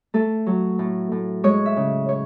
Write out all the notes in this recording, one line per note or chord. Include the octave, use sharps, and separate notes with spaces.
A3 A4
F#3
A2
A2
G#3 C#5
E5
C#3
C#5